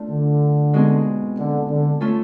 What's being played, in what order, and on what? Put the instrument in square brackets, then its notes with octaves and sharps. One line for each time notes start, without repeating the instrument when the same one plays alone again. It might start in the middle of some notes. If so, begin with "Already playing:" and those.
Already playing: [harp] A3 D4 F4
[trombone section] D3
[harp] B2 G#3 C4 D#4 G#4
[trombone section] D3
D3
[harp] A3 C#4 F4 A4